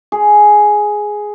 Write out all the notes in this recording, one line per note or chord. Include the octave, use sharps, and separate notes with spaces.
G#4